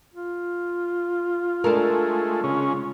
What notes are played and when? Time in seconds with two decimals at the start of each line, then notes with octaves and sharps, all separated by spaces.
0.14 F4
1.64 G#3 A3 D4 A4 A#4
2.44 C#3 G#3 C#4